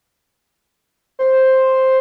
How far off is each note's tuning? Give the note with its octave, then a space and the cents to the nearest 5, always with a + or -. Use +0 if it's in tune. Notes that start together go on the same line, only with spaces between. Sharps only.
C5 +5